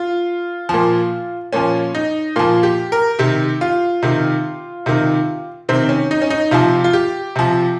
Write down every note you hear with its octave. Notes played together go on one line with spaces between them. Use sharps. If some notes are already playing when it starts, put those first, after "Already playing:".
Already playing: F4
A#2 F3
A#2 F3 C#4
D#4
A#2 F3 F4
G4
A#4
C3 D#3 G4
F4
C3 D#3
C3 D#3
C3 D#3 C4
C#4
D#4
C#4
D#4
C3 F3 F4
F4
G4
C3 F3